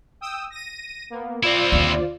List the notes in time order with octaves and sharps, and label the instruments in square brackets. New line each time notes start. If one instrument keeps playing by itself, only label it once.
[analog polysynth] G5 D#6 E6
A#6 D#7
A#3 B3
[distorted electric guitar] C4 E4 [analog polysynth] F4 C5 D5
[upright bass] D#2 D3